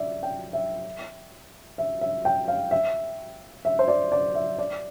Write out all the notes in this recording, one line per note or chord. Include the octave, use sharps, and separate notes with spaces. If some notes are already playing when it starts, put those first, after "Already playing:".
Already playing: D5 E5
G5
E5
E5
E5
G5
F5
E5
E5
C5
D5
D5
E5
D5